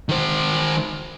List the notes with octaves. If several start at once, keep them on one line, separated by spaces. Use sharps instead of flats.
D#3 C5